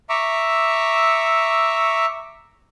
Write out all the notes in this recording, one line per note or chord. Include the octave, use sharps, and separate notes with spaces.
E5 A#5 C#6 D6 E6